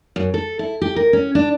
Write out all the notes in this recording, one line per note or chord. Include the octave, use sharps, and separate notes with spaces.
F#2
A4
E4
G4
A#4
C#4
D4